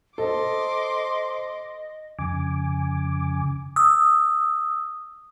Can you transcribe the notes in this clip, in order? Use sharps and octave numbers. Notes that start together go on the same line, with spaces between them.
A4 C5 D#5 C6 D6
F2 C#3 G#5 D6
D#6 E6